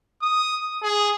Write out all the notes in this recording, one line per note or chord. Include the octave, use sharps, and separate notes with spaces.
D#6
G#4